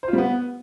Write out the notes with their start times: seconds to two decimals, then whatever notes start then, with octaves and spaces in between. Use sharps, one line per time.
0.03 C5
0.08 F4
0.13 G3
0.18 B3